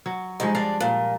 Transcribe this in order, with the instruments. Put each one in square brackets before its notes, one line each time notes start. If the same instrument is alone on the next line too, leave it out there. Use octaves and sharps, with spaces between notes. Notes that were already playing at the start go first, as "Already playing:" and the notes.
[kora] F#3
[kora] G2 F3 G#3 [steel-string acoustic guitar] D#4
[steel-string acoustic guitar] D4 [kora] D5 F5
[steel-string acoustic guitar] A#2